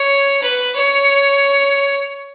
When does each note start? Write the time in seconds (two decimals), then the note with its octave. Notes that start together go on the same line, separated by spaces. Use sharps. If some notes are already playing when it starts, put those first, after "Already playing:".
Already playing: C#5
0.42 B4
0.76 C#5